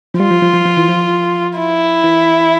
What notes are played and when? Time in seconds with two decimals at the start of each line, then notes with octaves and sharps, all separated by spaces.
0.14 F3
0.19 G3 F4
0.31 F3
0.42 F3
0.53 F3
0.65 F3
0.77 E3
0.89 F3
1.58 E4
2.04 E3